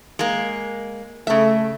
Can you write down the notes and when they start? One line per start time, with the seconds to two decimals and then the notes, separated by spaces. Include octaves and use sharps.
0.19 G#3 A#3
1.27 C#3 A3 E5